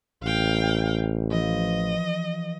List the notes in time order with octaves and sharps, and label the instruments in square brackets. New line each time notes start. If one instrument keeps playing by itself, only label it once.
[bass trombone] A1 [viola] F5 G5
[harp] E3 F3 [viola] D#5